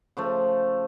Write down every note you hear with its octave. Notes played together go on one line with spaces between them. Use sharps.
C#3 F3 A3